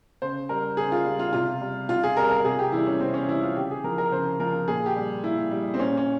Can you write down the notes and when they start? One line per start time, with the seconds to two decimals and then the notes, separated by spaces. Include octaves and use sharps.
0.22 C#3 C5
0.49 G3 A#4
0.77 C#3 G#4
0.92 F4
1.06 G3
1.19 F4
1.33 C3 F4
1.61 G3
1.89 C3 F4
2.04 G#4
2.17 G3 A#4
2.31 A#4
2.45 C3 G#4
2.59 G4
2.72 E3 G3 E4
2.87 C#4
3.00 C3 C4
3.14 C#4
3.28 E3 G3 E4
3.43 F4
3.56 C#3 G4
3.71 G#4
3.84 F3 A#4
3.98 A#4
4.12 C#3 C5
4.40 F3 A#4
4.68 A#2 G#4
4.86 G4
4.96 G3
5.23 A#2 E4
5.51 G3
5.74 C4
5.79 A#2 C#4
5.98 C#4